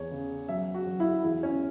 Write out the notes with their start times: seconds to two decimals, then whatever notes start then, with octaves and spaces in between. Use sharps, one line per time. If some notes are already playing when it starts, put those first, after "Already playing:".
Already playing: E2 C#5
0.11 C#3
0.49 F#3 E5
0.74 F#4
0.87 F#3
1.00 E4
1.24 E2 E4
1.43 C#4